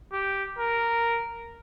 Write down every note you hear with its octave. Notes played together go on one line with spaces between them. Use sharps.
G4
A#4